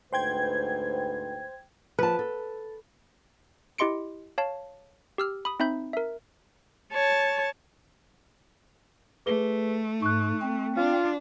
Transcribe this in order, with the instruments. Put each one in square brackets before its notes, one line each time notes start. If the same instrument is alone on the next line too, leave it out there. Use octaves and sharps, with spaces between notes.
[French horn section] D2 G#2 B4 [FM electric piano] C5 G5 G#6
[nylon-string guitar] F3 A5 [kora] B4
[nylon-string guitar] A4
[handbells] E4 G4 D#5 C6 C#7 D7
C#5 F5 A5
G4 E6 F6
B5 D#6
C4 D#4 E5 B5 G6
A#4 E5
[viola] C#5 A5
[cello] A3 [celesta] G#4 B4 G7
[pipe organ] G#2 [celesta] C#6 F#6
[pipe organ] C4
[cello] D4 [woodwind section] F4